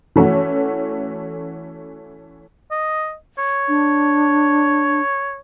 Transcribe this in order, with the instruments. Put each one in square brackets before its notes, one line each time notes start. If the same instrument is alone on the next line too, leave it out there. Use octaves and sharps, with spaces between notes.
[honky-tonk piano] E3 A3 C#4 F#4
[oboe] D#5
C#5
[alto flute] D4